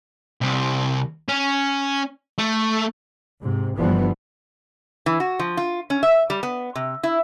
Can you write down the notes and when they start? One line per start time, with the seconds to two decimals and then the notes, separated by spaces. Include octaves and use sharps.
0.41 C2 C3
1.29 C#4
2.39 A3
3.42 G#2 C3
3.77 G1 G2 E3 F3 G3 B3
5.06 E3
5.20 F#4
5.39 F3
5.57 F4
5.90 C#4
6.03 E5
6.30 G3
6.43 B3
6.75 C3
7.03 E4